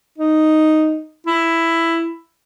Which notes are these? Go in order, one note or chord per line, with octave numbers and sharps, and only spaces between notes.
D#4
E4